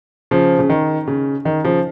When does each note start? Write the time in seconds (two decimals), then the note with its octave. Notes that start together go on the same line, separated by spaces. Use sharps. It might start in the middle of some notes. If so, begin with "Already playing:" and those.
0.31 C#3 F3
0.59 C#3
0.70 D#3
1.07 C#3
1.45 D#3
1.64 C#3 F3